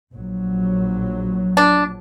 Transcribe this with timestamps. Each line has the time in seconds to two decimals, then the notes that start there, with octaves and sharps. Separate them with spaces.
0.14 A#1 F#3
1.57 D4